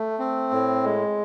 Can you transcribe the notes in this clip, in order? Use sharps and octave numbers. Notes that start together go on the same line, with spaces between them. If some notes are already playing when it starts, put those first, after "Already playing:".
Already playing: A3
C4
A2
G#3